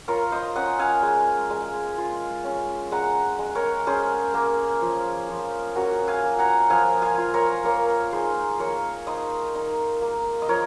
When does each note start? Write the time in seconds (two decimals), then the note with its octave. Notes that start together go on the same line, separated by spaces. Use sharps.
0.08 F4 A#4 C#5
0.32 C5 D#5
0.56 C#4 D#5 F#5
0.79 F5 G#5
1.03 G#3
1.50 G#3
1.98 F4
2.44 C#4
2.91 G#3 F#5 A#5
3.39 G#3
3.55 A#4 C#5
3.87 C#4 G#4 C5
4.34 A#3
4.82 F3
5.29 F3
5.75 C#4 F#4 A#4
6.08 F5 G#5
6.24 A#3
6.39 F#5 A#5
6.70 F3 F5 G#5
7.02 F5 G#5
7.18 F4
7.34 A#4 C#5
7.65 A#3 A#4 C#5
8.12 D#4 G#4 C5
8.59 A#3 A#4 C#5
9.07 D#4 C5 D#5
9.55 D#4
10.02 A#3
10.42 D#5
10.49 F3 A#4 C#5